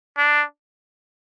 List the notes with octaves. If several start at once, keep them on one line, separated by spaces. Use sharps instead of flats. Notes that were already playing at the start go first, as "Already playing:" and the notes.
D4